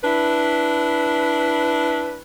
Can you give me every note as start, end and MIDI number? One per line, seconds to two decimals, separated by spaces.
0.04 2.21 62
0.04 2.21 64
0.04 2.21 71